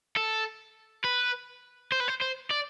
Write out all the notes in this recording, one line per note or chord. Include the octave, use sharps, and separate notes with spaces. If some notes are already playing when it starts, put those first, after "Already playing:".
A4
B4
C5
B4
C5
C5
D5